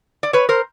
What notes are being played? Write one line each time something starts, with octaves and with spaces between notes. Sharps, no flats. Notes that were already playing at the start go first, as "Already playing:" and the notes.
D5
B4 C#5
A#4 C5